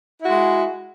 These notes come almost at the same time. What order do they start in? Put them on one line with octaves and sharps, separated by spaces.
E4 F#4 G#3